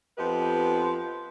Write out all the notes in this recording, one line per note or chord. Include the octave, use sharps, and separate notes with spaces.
F2 F3 B3 G4 B4 D#5